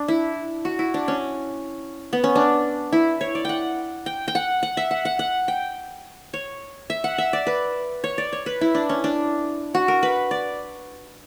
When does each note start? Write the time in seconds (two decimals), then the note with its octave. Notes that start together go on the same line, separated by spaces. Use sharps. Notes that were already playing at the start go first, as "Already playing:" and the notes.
Already playing: D4
0.08 E4
0.65 F#4
0.79 E4
0.94 D4
1.08 C#4
2.13 B3
2.24 C#4
2.35 D4
2.92 E4
3.21 C#5
3.35 D5
3.45 F#5 G5
4.06 G5
4.28 G5
4.35 F#5
4.63 F#5
4.77 E5
4.91 F#5
5.05 F#5
5.19 F#5
5.48 G5
6.34 C#5
6.90 E5
7.04 F#5
7.18 E5
7.33 D5
7.47 B4
8.04 C#5
8.18 D5
8.32 C#5
8.46 B4
8.61 E4
8.75 D4
8.89 C#4
9.04 D4
9.74 F#4
9.88 A#4
10.03 B4
10.31 D5